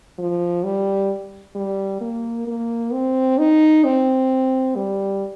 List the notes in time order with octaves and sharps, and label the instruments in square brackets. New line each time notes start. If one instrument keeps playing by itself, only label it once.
[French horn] F3
G3
G3
A#3
A#3
C4
D#4
C4
G3